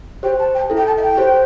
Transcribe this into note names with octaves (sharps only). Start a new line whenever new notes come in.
G4 C5 G5
A5
G5
E4 A4
G5
A5
E5
G5
G4 C5